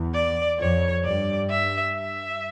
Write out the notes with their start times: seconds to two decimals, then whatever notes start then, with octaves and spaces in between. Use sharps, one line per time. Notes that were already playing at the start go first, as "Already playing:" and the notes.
Already playing: E2
0.14 D5
0.59 F2 C#5
1.04 G2 D5
1.50 E5
1.95 E5